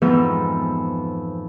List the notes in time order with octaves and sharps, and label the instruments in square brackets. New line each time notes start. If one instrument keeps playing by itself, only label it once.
[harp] F2 G#2 E3 F3 B3 G6